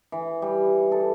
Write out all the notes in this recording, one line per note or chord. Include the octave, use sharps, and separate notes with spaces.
E3
G3
A4